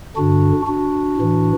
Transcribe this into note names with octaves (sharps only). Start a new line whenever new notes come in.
G2 D3 D4 F#4
D4 F#4
A2 E3